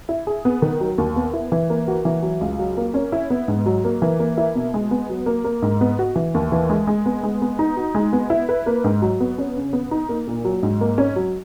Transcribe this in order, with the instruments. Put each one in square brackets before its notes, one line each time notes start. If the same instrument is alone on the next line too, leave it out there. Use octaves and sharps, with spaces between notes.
[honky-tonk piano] E4
G#4
B3
D#3
F#3
D#2
B3
E4
E3
A#3
F#4
E3
F#3
C#2
F#3
A#3
C#4
E4
B3
G#2
F#3
A#3
E3
A#3
E4
B2
G#3
B3
F#3
A#3
A#3
G#2
B3
F#4
E3
D#2
E3
G#3
G#3
B3
G#3
B3
D#4
F#4
G#3
B3
E4
B4
A#3
G#2
F#3
B3
C#4
C#3
B3
D#4
A#3
A#2
F#3
G#2
A#3
C#4
F#3